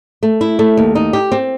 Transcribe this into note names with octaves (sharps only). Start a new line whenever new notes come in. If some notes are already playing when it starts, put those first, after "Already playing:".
A3
E4
A3
D#2
D#4
G4
C4